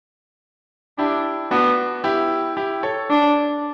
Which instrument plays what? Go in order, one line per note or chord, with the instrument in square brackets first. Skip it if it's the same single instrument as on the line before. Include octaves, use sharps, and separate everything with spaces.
[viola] D4 [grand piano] E4 G4
[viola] B3 [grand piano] D4 F#4
[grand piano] E4 G4
E4 G4
A4 C#5
[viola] D4